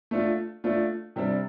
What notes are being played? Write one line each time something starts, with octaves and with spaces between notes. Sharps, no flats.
A3 D4 F4
A3 D4 F4
C3 G3 D4